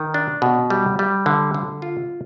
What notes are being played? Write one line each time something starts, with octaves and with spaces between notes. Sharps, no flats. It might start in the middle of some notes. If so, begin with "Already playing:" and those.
Already playing: D#3
D4
B2
G3
G3
D3
D3
F4